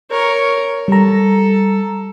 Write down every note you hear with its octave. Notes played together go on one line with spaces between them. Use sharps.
A#4 C#5
G3 A4 A#5